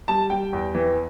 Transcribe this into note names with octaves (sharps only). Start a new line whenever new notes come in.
G3 A5
G3 G5
E2
E3